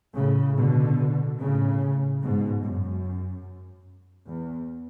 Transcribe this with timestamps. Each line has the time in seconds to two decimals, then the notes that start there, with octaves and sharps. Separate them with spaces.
0.16 A2 C#3
0.57 B2 D3
1.39 A2 C#3
2.21 G#2 B2
2.62 F#2
4.27 E2